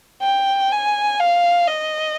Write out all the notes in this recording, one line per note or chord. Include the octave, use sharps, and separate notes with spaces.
G5
G#5
F5
D#5